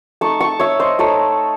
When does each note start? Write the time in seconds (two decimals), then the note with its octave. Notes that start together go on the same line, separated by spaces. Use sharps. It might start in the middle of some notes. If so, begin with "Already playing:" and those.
0.21 A3 D#4 A5 C#6
0.40 A5 C#6
0.60 C#5 E5
0.80 C5 D#5
0.99 A3 D#4 A4 C#5